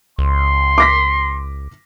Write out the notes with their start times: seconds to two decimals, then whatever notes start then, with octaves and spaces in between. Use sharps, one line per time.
0.19 C#2 C6
0.78 D6 A#6 B6